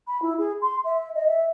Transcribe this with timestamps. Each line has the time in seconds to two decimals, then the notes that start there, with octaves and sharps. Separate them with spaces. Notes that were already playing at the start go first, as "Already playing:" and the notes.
0.07 B5
0.22 E4
0.38 G#4
0.61 C6
0.84 E5
1.15 D#5
1.27 E5